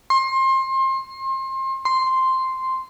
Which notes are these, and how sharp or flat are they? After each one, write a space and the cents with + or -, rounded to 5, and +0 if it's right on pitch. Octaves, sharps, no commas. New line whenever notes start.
C6 +30
C6 +0